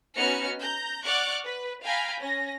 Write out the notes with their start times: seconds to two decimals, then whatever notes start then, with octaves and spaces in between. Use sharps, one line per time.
0.16 B3 C#4 D#4 F#4 F6 C#7
0.61 A#5 G6
1.05 D5 F#5 C#6 D6 F6 F#6
1.44 B4
1.84 F5 G5 G#5 A#5 B5 F6
2.20 C#4 A#6